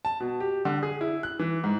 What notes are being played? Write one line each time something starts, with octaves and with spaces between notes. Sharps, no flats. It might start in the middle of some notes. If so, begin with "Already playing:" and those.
A5
B2
G4
D3
G#4
E4
F#6
E3
G#2